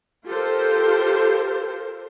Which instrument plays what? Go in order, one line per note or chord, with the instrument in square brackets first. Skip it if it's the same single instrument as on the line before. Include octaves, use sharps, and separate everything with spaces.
[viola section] F4 G4 A4 A#4 C5